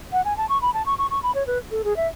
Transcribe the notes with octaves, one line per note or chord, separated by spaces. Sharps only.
F#5
G#5
A5
C#6
B5
A5
C#6
C#6
C#6
B5
C#5
B4
A4
G#4
E5